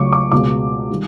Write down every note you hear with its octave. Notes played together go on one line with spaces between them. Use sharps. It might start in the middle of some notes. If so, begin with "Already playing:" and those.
Already playing: C#2 C#3 F#3 A3 C#6 D6
D6
C#2 B2 G#3 D6
D#3 G3